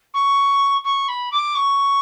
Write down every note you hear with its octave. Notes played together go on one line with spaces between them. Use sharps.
C#6
C#6
B5
D6
C#6